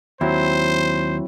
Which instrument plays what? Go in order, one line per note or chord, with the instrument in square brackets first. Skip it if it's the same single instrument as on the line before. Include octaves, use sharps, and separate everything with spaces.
[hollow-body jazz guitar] D#2 [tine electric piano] F#3 C4 E4 [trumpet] C5